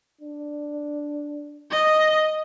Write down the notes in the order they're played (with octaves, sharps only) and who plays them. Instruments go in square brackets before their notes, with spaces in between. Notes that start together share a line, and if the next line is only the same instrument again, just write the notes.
[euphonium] D4
[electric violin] D#5